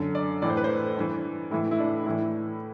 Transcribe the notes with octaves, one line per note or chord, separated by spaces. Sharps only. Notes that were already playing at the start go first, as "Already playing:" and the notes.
Already playing: F#2 D3
D5
A2 E3 D5
C5
B4
C5
G2 E3
A2 E3 E4
E4
D4
A2 E3 E4